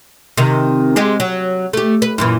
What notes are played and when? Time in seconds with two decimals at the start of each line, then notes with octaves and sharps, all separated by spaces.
0.37 C3 D#3
0.96 G#3 C4 G4
1.20 F#3
1.73 A3 G4
2.02 B4
2.18 F#2 A#2 E3